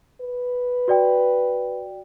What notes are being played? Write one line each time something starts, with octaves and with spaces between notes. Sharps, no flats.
B4
F#4 D5 G5